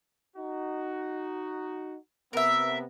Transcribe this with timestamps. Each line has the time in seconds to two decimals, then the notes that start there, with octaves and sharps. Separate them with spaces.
0.36 D#4 F#4
2.33 C3 B3 A#4 E5